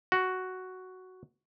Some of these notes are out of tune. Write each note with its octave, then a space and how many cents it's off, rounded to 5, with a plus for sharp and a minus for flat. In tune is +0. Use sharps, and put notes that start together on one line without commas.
F#4 +5